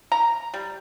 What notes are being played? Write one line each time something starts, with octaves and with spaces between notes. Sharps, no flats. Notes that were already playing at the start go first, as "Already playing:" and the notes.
A#5
G3